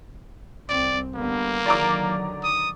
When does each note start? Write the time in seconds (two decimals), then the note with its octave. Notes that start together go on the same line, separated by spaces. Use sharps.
0.69 C2 C4 D5
1.15 D3 G3 A#3 B3
1.66 D3 D#3 F#3 D5 A#5 D6
2.44 D#6